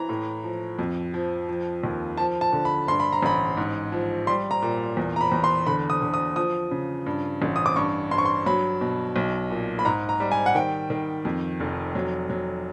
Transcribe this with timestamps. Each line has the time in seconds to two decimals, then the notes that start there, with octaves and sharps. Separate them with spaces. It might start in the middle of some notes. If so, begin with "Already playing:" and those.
Already playing: E3 A#5
0.09 A2
0.44 F3
0.79 F2
1.14 F3
1.48 F3
1.84 D#2
2.17 F3 A5
2.41 A5
2.53 D3
2.65 B5
2.88 G2 C6
3.00 B5
3.13 A#5
3.23 A1 B5
3.57 G#2
3.92 F3
4.27 G3 C6
4.51 A#5
4.62 A#2
4.97 E2
5.16 A#5
5.21 B5
5.32 E2
5.44 C6
5.67 D3 B5
5.90 D#6
6.02 D3
6.14 D#6
6.36 F3 D#6
6.71 C#3
7.06 G2
7.42 A1
7.56 D#6
7.66 D6
7.76 G2 C#6
8.11 G2 C6
8.18 C#6
8.25 C6
8.46 F#3 B5
8.81 B2
9.16 B1
9.50 A#2
9.79 B5
9.85 G#2 A#5
10.09 A#5
10.20 G3
10.32 G#5
10.46 F#5
10.55 D#3 G5
10.90 D#3
11.25 F2
11.60 F1
11.95 F#3
12.30 F#3